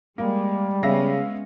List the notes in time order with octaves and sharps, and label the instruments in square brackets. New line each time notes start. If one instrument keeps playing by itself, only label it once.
[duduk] G3 [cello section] G#3 [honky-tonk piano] A#3
[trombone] C#3 [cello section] G#3 B3 C#4 [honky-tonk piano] E5 F5 A#6